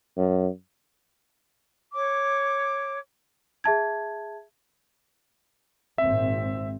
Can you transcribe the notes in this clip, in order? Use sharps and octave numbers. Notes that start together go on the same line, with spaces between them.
F#2
C#5 D6
G#4 E5 A5 G#6
G#1 A#2 C4 E5